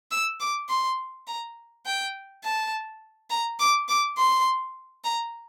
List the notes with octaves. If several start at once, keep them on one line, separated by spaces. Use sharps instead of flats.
E6
D6
C6
A#5
G5
A5
A#5
D6
D6
C6
A#5